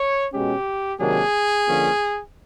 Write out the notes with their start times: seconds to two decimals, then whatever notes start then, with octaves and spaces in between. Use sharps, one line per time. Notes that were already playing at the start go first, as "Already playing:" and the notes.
Already playing: C#5
0.32 B2 G#3 C#4 G4
0.99 C3 D#3 F#3 A#3 D4 G#4
1.66 D3 F3 A#3 C#4